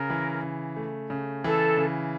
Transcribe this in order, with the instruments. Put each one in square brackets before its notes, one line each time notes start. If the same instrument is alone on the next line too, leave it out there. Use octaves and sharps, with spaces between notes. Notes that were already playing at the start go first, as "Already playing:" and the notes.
Already playing: [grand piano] C#3 [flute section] A#4
[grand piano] E3
C#3
A3
C#3
[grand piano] E3 [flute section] A4
[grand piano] C#3